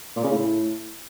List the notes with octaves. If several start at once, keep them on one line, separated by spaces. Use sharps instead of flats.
A#2
C#3
A2